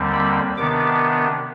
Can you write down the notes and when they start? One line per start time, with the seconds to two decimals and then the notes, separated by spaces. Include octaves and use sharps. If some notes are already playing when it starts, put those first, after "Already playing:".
Already playing: D#2 D3 G3 C4
0.13 B5
0.57 C3 D#3 B3 D4 D6